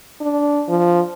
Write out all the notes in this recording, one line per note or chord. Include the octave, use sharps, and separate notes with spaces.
D4
F3